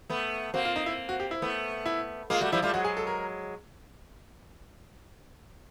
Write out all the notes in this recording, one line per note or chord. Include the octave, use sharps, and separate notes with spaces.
A3 B3
A#3 C4 F#4
F4
D#4
E4
F#4
G4
E4
A3 B3
E4
G#3 A#3 F4
G3 A3 F#4
F3 G3 E4
G3 A3 F4
F#3 G#3 F#4
G#4
A4
A#4